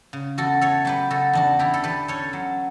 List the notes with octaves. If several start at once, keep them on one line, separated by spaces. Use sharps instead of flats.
C#3
E2 F#4 A4
A3 A4 C#5
F#3 G4 B4
C#3 F#4 A4
E2 D4 F#4
D3 E4 G4
A4
E2 G4 B4
C#4 A4 C#5
F#3